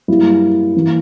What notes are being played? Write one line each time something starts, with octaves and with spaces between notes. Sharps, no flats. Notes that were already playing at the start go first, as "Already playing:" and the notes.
G2 F#3 A#3 E4
E3 A#3